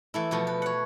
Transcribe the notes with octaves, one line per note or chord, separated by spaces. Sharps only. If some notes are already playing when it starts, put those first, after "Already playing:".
E3 A3 E4
B2 F3 A3 B3
B4
C#5 F#5